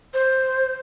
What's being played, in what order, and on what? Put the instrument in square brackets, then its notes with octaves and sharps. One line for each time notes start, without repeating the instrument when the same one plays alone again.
[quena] C5